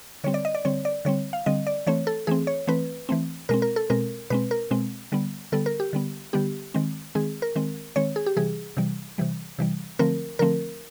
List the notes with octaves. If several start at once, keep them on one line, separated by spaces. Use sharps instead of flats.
D3 G3 C4 C#5
D5
D#5
D5
D3 G3 C4 C#5
D5
D3 G3 C4 C#5
F5
D3 G3 C4 D#5
D5
E3 A3 C4 C#5
A4
E3 A3 C4 G#4
C#5
E3 A3 C4 B4
E3 A3 C4
B2 G#3 C4 A#4
A#4
A4
B2 G#3 C4 A#4
B2 G#3 C4 B4
A#4
B2 G#3 C4
D3 G3 B3
D3 G3 B3 A4
A#4
G4
D3 G3 B3
D3 G3 B3 G4
D#3 G#3 C4
D#3 G#3 C4 G#4
A#4
D#3 G#3 C4
D#3 G#3 C4 C#5
G#4
G4
C3 E3 G3 G#4
C3 E3 G3
C3 E3 G3
C3 E3 G3
D3 F3 A3 C4 A#4
D3 F3 A3 C4 A#4